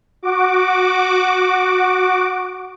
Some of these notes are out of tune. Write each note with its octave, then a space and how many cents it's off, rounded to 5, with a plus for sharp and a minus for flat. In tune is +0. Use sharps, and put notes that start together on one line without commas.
F#4 +0 D6 +0